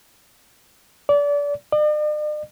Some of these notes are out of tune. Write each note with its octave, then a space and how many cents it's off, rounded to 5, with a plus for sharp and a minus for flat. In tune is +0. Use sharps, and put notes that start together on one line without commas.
D5 -30
D5 +45